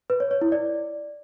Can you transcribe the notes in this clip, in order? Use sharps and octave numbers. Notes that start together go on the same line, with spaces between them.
B4
C#5
C#5
E4
D5